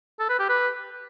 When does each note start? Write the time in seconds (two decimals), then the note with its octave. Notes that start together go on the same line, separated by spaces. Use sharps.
0.19 A4
0.29 B4
0.39 G4
0.49 B4